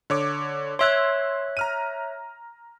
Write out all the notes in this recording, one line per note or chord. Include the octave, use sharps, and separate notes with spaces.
D3 C#5 D6
C#5 E5 C6 E6 F#6 G#6
A#5 F6 D#7